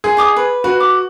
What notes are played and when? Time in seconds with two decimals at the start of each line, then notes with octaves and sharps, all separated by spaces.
0.04 G#4 C6
0.17 D#4 D6 D#6
0.37 B4
0.64 F#4 B4
0.80 D6